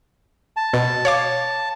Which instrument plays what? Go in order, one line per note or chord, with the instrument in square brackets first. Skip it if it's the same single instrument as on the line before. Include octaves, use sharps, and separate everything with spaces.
[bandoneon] A5
[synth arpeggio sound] B2
C#5 F5 D6